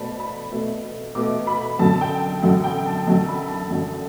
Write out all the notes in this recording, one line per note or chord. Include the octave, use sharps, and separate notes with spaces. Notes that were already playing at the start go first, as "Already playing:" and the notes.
Already playing: B2 A3 C5 D5 A5 B5
B5
B2 A3
B2 A3 D6
B5
F#2 D3 F#3 A5
G5
F#2 D3 F#3 F#5
G5
A5
F#2 D3 F#3 A5
B5
A5
F#2 D3 F#3